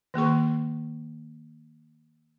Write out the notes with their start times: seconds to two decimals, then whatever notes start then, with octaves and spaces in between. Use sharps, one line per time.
0.14 D#3 A#3 G#4 C#6